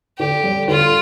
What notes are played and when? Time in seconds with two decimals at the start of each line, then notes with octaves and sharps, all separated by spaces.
0.19 D3 G4
0.44 G3
0.68 D3 F4